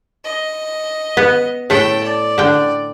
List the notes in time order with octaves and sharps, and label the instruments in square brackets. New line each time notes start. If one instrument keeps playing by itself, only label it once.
[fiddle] D#5
[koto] B3
[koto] A2 A3 [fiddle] G5 A5
[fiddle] D5
[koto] D3 G5